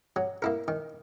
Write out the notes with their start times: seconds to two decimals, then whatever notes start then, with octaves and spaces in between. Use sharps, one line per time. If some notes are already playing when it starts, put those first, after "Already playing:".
0.16 F#3
0.42 A#3 E4 A#4
0.68 D#3